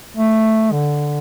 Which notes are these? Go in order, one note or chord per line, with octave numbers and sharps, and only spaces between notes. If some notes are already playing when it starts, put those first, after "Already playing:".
A3
D3